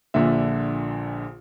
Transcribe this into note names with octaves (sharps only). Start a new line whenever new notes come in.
A#1 A#2 D3 E5